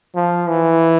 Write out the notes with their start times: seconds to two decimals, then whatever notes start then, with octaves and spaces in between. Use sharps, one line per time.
0.16 F3
0.49 E3